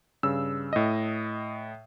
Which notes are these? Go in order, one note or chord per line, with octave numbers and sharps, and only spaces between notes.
G2 C#3 E6
A2 D#5